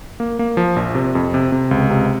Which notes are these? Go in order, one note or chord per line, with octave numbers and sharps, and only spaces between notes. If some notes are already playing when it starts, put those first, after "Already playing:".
A#3
A#3
F3
A#1
C3
F2
C3
C3
C#2
C3